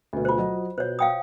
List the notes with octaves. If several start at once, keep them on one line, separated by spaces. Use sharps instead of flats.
D2 B2
F4 C5
F#3 D#5
B2 C5 C#5
F5 G5 D#6